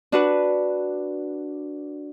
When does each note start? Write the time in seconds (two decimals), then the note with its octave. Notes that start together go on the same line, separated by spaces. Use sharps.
0.12 D4 F#4 B4